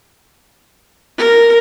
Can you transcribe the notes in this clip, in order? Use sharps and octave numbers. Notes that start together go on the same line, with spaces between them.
A#4